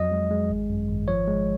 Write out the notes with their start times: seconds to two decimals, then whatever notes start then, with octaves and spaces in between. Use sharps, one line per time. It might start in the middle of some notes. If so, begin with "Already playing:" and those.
Already playing: F2 F#3 D#5
0.12 G#3
0.31 G#3
0.50 G#1
0.70 F#2
0.89 G#1
1.08 F3 C#5
1.28 G#3